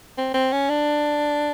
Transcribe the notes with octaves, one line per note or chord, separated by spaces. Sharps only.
C4
C4
C#4
D4